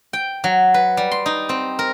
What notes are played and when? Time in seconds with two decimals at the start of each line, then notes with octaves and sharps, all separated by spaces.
0.13 G5
0.44 F#3
0.74 B4
0.97 G3
1.11 C6
1.26 D#4
1.49 C4
1.79 A#4